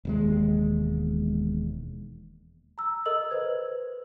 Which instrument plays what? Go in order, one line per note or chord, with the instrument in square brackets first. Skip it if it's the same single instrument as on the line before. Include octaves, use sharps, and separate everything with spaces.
[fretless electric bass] E1 D#2 G#3
[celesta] A#5 E6
A4 A#4 D#5 E6 F#7
B4 C5 G#6